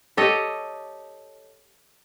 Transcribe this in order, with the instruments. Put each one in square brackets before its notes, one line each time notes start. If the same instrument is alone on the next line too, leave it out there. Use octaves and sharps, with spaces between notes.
[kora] G4 A4 C#5 D#5